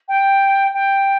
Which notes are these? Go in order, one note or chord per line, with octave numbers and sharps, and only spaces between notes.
G5
G5